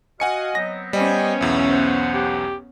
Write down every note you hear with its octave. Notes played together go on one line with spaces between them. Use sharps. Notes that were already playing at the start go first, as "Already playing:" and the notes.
F#4 D#5 F5 F#5 G#5 C#7
F#3 B3 C4 A#6
G3 B3 C#4 C5 D#5 G5 G#5
B1 E2 E5
C5 F#5
G4